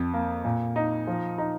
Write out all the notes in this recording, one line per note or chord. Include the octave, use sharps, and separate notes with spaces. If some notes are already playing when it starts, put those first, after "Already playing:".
Already playing: F2
A#3
A#2
D#4
F3
D#4